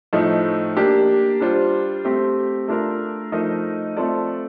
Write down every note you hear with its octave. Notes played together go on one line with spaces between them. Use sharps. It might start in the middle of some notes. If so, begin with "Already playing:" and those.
A2 F3 A3 D#4
A#3 D4 G4
G3 D4 F4 C5
A3 C4 G4
A3 D4 F4 A#4
F3 A3 D#4 A#4 D#5
A3 C4 F4 A4 D5